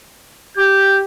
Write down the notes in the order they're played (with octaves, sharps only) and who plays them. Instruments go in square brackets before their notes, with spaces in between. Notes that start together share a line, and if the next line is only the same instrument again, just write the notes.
[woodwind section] G4 [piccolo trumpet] G6